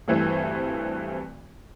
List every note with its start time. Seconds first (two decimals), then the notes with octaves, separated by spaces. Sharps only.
0.08 D2 G2 E3 A3 C4